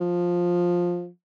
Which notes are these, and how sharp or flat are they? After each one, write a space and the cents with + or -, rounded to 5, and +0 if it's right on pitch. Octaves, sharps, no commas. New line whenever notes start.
F3 +10